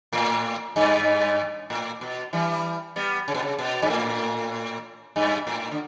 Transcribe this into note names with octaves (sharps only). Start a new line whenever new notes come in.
A2
G2
A2
B2
E3 G3
G3 B3
C#3
B2
C#3
B2
G2
A2
G2
A2
D3